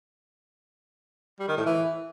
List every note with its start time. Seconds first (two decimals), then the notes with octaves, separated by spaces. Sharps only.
1.39 G3
1.48 D#3
1.57 A2
1.66 E3